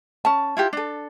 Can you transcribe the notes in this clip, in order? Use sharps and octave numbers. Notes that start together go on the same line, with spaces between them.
C#4 A5
E4 F4 G4
D4 A4